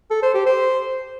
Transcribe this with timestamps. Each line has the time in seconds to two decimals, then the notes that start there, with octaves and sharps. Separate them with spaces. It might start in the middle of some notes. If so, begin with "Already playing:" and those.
0.11 A4
0.22 C5
0.34 G4
0.46 C5